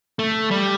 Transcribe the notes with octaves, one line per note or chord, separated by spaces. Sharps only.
A3
G3